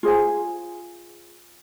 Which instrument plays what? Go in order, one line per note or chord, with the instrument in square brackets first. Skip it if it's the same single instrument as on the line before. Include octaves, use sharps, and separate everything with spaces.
[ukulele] F4 G#4 C5 G#5